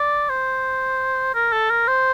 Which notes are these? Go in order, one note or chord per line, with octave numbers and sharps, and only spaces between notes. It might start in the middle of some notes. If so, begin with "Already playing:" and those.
Already playing: D5
C5
A#4
A4
A#4
C5